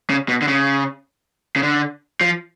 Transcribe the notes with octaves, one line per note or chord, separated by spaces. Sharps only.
C#3
B2
D3
C#3
C#3
D3
F3